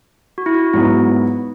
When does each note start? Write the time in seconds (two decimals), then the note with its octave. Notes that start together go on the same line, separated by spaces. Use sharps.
0.38 F#4
0.46 E4
0.55 F#4
0.73 G#2 F#3 B3 E4